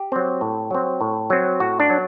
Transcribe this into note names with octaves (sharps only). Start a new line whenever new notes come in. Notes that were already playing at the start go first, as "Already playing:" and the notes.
Already playing: G4
F#3 C4
A2
F#3 C4
A2
F#3 C4
A2 F#4
D4
F#3